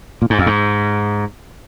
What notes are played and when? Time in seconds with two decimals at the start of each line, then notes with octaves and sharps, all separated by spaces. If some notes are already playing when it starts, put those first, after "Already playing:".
0.22 A#2
0.30 G#2
0.39 F2
0.46 G#2